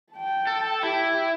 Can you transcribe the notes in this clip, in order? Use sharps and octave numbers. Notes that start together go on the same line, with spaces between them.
G5 A5
A4
E4 G4 G5